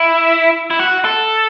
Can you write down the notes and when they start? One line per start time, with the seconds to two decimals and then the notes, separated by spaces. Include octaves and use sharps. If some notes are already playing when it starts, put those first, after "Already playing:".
Already playing: E4
0.71 E4
0.79 F#4
1.05 A4